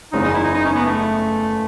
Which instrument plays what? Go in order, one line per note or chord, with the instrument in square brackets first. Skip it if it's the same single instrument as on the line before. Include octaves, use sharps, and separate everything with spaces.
[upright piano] F#1 E2 C#3 G#3 [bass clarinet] D#4
[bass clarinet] D#4
E4
D#4
D#4
C#4
B3
A3